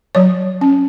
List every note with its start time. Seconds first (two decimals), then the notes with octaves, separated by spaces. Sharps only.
0.15 F#3 C#5
0.61 C#4